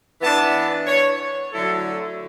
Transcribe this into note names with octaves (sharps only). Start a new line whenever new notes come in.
E3 B3 D4 A5
C#5
D3 F#3 A3 E4 A4